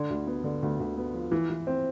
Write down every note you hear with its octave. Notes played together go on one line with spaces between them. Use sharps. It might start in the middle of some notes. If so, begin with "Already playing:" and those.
Already playing: D3
D2
B3
D3
D2
D2
B3
F3
E3
E3
C4